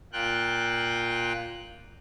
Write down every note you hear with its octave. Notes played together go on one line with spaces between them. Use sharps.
A#2 F4 G5 F#6